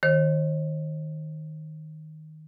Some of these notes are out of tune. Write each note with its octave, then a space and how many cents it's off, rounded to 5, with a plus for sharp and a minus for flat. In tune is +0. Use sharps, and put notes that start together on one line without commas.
D#3 +0 C5 +45